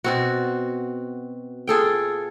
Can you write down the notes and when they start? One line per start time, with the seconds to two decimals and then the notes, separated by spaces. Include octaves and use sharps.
0.04 B2 C4 F#4
1.67 F4 G#4 A4 G5